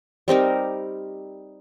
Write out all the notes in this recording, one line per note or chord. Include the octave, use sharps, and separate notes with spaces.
G3 C4 D#4 A#4